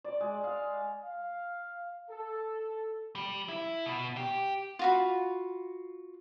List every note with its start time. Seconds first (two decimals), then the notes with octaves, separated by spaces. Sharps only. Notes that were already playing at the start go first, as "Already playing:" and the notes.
0.04 D5
0.20 G#3
0.44 F5
1.04 F5
2.10 A4
3.16 G3
3.49 E4
3.86 B2
4.17 G4
4.79 F4 F#4 B5